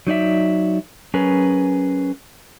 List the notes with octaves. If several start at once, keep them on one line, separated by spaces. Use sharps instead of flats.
F#3 D#4 D5 E5
F#3 C#4 G#4 A#4 B4